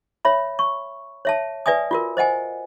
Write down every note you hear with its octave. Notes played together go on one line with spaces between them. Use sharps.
C#5 E5 B5
C#6
C#5 E5 A5
B4 D5 E5 G#5 D#6
F4 F#4 A#4
C5 D#5 F#5 G#5